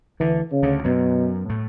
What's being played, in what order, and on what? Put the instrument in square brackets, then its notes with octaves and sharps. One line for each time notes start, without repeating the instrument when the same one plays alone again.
[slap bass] D2 D3 [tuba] E3
[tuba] C#3
[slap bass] D2 D3
[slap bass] F#2 F#3 [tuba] B2
[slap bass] A2 A3